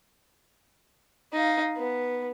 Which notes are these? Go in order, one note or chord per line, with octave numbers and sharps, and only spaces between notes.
D#4 F5
B3